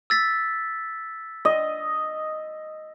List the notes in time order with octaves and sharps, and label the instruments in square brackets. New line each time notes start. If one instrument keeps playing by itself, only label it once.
[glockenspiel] E6 A6 B6
[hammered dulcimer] D#5